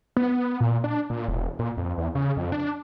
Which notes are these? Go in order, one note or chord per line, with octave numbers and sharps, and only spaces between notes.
B3
A#2
D4
A#2
E1
A#2
F2
E2
C#3
F2
D4